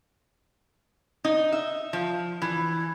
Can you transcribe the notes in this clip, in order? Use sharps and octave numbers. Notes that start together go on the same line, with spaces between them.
D#4
E5
F3
E3